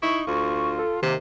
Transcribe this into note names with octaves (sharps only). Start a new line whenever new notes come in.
D#4 E4 C#6
D2 F4 C#6
A4
C3 D#3 A#3